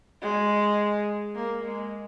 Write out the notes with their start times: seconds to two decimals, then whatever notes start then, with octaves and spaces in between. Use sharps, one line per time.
0.22 G#3
1.35 A#3
1.64 G#3